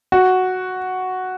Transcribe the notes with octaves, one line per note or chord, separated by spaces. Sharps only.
F#4